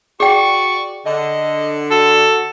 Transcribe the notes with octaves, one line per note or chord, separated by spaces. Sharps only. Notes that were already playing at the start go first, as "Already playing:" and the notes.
F#4 G#4 D5 G5 C#6
D3 D#5
F#4 A4